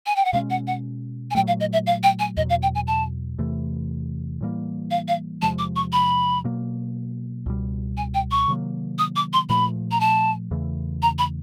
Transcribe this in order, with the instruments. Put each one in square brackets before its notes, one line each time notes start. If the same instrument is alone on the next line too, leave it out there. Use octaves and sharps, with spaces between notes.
[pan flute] G#5
G5
F#5
[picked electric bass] B2 G#3 C#4 [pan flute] F5
[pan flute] F#5
F#5
G#5
[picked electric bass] A#2 F#3 A3 [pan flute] G5
[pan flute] F5
D#5
E5
F5
G5
G#5
[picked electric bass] E2 B2 F#3 [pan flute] D#5
[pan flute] F5
G5
G#5
A5
[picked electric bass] E2 C3 E3 A3
A2 E3 G3 A#3
[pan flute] F5
F5
[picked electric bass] E2 C3 F3 G#3 [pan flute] A5
[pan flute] D6
C#6
B5
[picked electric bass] B2 F#3 A#3
C#2 B2 G3
[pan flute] G#5
G5
C#6
[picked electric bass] C3 D#3 F#3 A#3
[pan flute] D#6
D6
C6
[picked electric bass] A#2 F3 A3 [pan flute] B5
[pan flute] A#5
A5
[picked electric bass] E2 C#3 E3 A3
[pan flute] A#5
B5